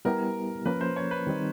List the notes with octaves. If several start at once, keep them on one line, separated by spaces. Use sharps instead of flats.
G3 B3 E4 G4 A#4
F3 A#3 C#4 B4
C5
C#5
B4
D#3 G3 C4 D#4